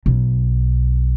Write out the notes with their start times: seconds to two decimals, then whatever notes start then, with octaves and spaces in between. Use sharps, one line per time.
0.06 B1